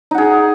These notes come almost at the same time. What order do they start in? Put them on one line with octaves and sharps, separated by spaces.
D#4 F#5 G#4